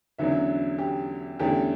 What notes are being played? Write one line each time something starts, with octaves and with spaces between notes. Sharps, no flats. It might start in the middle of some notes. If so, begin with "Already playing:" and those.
E2 D3 F#3 C#4 E5
G4
E2 D3 A3 C#4 G4